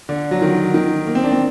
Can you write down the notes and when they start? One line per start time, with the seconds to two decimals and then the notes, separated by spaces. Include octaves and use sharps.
0.09 D3
0.31 F#3
0.42 D#3
0.74 D#3
1.07 A#3
1.15 C4
1.24 D4
1.32 C4